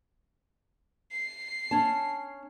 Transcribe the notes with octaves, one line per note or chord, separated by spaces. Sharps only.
C7
C#4 A5